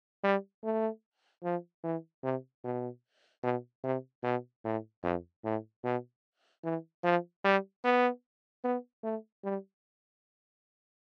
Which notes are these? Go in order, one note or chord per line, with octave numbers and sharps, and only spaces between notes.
G3
A3
F3
E3
C3
B2
B2
C3
B2
A2
F2
A2
B2
E3
F3
G3
B3
B3
A3
G3